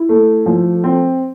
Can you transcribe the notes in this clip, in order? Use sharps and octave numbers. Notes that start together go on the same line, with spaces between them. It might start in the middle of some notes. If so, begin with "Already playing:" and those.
Already playing: E4
A3
F3
C4